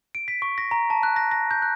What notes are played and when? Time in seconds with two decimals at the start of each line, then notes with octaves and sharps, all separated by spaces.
0.15 D7
0.28 B6
0.42 C#6
0.58 A#6
0.71 A#5
0.90 A5
1.03 F#6
1.16 A#6
1.31 A#6
1.51 G6
1.62 F#6